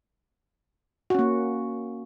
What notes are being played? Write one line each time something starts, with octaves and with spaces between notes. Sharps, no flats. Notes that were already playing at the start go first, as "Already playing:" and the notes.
A#3 C#4 F#4